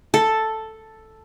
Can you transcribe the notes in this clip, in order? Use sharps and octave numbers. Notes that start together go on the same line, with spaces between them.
A4